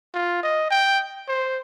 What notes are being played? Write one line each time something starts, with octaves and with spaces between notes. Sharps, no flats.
F4
D#5
G5
C5